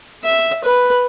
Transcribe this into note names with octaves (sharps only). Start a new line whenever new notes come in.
E5
B4